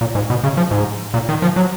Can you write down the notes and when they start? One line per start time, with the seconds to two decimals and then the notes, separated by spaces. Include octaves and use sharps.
0.01 A#2
0.15 G#2
0.30 B2
0.44 C#3
0.57 F3
0.71 G#2
1.14 A#2
1.29 D#3
1.42 F3
1.56 F#3